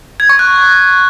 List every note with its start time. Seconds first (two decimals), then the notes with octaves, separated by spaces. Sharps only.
0.20 G#6
0.29 C#6
0.39 F#6